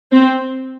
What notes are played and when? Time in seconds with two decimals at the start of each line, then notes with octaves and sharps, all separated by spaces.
0.12 C4